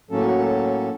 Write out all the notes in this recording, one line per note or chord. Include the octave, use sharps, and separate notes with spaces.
A2 F#3 A#3 C#4 A4
F#4
A4